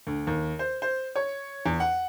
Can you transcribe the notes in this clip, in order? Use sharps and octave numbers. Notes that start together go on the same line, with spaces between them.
D2
D#2
C5
C5
C#5
E2
F#5